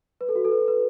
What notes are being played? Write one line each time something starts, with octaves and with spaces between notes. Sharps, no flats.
B4
A4
F#4
A4
B4
B4